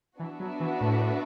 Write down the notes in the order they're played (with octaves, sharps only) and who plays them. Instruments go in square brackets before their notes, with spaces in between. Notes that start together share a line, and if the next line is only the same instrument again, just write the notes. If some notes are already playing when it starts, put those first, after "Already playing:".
[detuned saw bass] E3 [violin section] B3 D4 F#4 B4 E5
[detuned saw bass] F#3
E3
A2